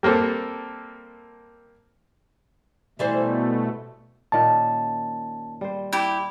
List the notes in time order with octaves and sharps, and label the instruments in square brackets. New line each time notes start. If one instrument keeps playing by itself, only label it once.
[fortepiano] G3 A#3 C4 A4
[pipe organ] B2 A3 [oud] E3 G3 C5
[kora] A#2 D#3 C#4 [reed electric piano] A5
[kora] G3 C5
[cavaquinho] E4 G4